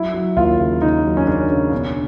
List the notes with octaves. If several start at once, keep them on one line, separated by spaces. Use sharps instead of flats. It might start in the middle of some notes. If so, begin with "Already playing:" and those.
Already playing: F#3 E4
F#3
D#2 F4
C#3
C#3 D#4
F#3
C#4
C#3 D4
C#3
B2 D4